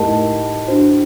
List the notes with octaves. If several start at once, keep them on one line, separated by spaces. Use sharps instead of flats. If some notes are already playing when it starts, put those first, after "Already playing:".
Already playing: A2 D#4 G4 A#4 D#5 A5
D4 F#4 C5